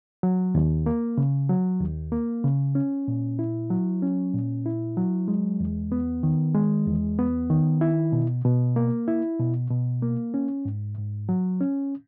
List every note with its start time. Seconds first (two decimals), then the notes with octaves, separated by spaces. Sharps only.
0.23 F#3
0.55 D#2
0.86 A#3
1.18 C#3
1.49 F#3
1.81 D#2
2.12 A#3
2.44 C#3
2.75 C#4
3.08 A#2
3.39 E4
3.70 F#3
4.02 C#4
4.34 A#2
4.66 E4
4.97 F#3
5.28 G#3
5.60 E2
5.92 B3
6.23 D#3
6.55 G#3
6.86 E2
7.19 B3
7.50 D#3
7.81 E4
8.12 B2
8.44 B2
8.76 A#3
9.08 E4
9.40 B2
9.70 B2
10.02 A#3
10.34 C#4
10.65 G#2
10.98 G#2
11.29 F#3
11.61 C#4